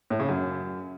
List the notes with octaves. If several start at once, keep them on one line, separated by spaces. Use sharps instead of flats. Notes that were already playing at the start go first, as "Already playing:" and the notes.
A2
C#3
F#2